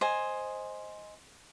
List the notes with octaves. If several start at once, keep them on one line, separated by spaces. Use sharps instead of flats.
C5 D#5 G#5